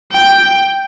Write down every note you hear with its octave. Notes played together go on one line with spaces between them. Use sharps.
G5